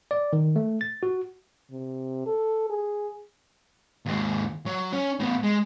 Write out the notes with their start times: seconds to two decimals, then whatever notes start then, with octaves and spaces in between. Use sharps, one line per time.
0.11 D5
0.33 D#3
0.56 A3
0.81 A6
1.03 F#4
1.71 C3
2.26 A4
2.70 G#4
4.06 D#2 G#3
4.66 F#3
4.93 C#4 C#5
5.20 A2 B3
5.44 G#3